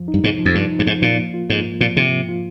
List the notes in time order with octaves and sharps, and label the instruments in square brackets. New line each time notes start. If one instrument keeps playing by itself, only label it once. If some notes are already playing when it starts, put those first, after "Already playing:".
Already playing: [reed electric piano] F2 F3
D#4
[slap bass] G2
[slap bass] G#2 [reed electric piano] C3
[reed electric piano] F3
[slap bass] F2
[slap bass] G2 [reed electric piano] F3
[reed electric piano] D#4
[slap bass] G2
[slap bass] G#2 [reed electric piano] F3
[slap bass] A#2 [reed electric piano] F3
[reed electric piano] A#3
F4
[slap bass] G#2 [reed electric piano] A#3
[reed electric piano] G#2
[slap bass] A#2 [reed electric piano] F3
[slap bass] C3 [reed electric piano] F3
[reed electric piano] G#2
F4